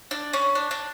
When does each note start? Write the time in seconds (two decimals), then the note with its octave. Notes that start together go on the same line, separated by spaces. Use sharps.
0.11 D4
0.33 C#4
0.55 D4
0.71 D4